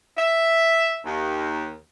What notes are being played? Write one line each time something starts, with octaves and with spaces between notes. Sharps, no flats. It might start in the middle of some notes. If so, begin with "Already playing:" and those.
E5
D#2